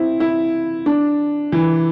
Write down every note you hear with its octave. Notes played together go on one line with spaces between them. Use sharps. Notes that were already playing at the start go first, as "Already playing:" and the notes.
Already playing: C4 E4
E4
D4
E3